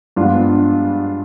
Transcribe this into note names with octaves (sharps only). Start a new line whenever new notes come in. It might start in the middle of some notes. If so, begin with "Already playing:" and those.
G2 F3 G#3 B3 D4 F4